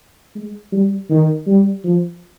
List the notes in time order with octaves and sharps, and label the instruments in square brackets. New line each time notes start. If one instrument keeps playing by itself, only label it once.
[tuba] G#3
G3
D#3
G3
F3